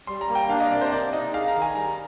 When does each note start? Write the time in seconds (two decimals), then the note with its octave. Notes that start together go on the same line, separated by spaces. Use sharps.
0.07 G3 C6
0.21 A#5
0.29 A#3
0.35 G5
0.49 D4 F5
0.60 D#5
0.71 C3 D5
0.81 C5
0.91 A#3 D5
1.13 D#4 D#5
1.34 G#4 F5
1.48 A#5
1.55 D#3
1.62 G#5
1.75 G3 A#5